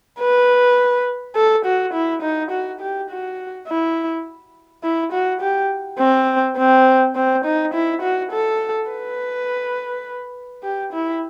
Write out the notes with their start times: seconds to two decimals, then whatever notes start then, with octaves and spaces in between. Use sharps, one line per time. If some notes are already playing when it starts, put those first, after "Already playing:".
0.20 B4
1.35 A4
1.65 F#4
1.94 E4
2.22 D#4
2.51 F#4
2.81 G4
3.10 F#4
3.68 E4
4.83 E4
5.12 F#4
5.41 G4
5.99 C4
6.57 C4
7.15 C4
7.45 D#4
7.74 E4
8.02 F#4
8.32 A4
8.90 B4
10.63 G4
10.93 E4